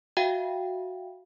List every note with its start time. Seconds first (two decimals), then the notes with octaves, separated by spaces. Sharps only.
0.17 F#4 E5 F5 G5